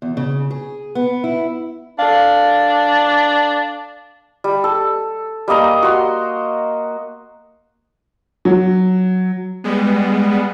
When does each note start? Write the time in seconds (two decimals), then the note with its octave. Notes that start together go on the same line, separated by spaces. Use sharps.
0.02 E2
0.17 C#3
0.51 G#4
0.95 B3
1.24 E4
1.99 D4 A4 F5
4.44 G3
4.64 A4
5.48 G3 A#3 D#5 A#5
5.83 F#4 C6
8.45 F#3
9.64 G3 G#3 B3